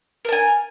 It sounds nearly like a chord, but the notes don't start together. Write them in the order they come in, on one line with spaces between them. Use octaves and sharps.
A#4 A5 G#5